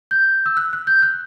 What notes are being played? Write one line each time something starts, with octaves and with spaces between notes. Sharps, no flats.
G6
E6
F#6
F#6
G6
F#6